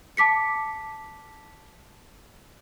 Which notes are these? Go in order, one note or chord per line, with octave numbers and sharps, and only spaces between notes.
A5 D6 B6 C#7